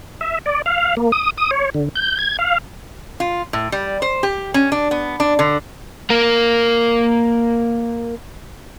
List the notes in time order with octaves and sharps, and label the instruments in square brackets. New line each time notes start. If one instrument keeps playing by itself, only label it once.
[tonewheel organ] E5
D5
F5
A#3
D#6
D#6
C#5
D3
G6
G#6
F5
[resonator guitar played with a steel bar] F4
A2
G3
C5
G4
C#4
D4
B3
D4
D3
[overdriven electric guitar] A#3 A#4